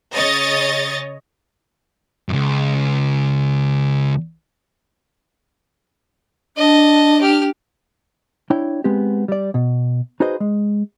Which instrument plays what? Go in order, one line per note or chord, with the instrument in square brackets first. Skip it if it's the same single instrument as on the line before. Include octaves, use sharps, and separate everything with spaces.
[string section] C#3 C#5 D#5 A6
[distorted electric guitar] C#2 F#2
[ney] D4 [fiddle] D#5 A5
[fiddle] G4 F6
[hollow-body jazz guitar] D4 E4 C#5 G5
G#3 B3 C4 G4
G3 D5
B2
D#4 F#4 G#4 B4 C5 D#5
G#3